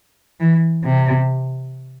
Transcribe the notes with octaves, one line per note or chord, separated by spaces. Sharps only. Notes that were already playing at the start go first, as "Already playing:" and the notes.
E3
C3